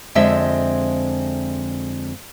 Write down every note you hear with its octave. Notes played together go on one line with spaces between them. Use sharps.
F2 D3 G#3 C4 F4 E5